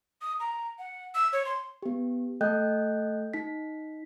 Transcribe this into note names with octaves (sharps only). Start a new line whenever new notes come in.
D#6
A#5
F#5
E6
C#5
C6
B3 G4
A3 A4 D#5 G5 F#6 G6
D#4 B6